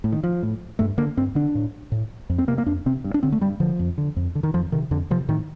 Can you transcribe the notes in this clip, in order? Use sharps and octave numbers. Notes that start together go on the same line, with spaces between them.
A2
D#3
F3
A2
G2 A3
D3 A#3
G2 C4
D3 D4
A2
A2
F2
C4
C3 A#3
A#3
F2 D4
C3 C4
G2
D4
D3 C4
A3
G2 G3
D3 F3
F2
D3
F2
D3
D#3
F2 F3
C3 D#3
F2 D3
C3 F3
A2 D#3